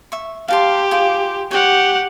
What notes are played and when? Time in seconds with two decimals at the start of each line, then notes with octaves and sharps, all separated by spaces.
0.12 E5 C#6
0.48 G4 F5 A5 C6
0.91 F4 G#4
1.51 G4 C#5 F#5 G5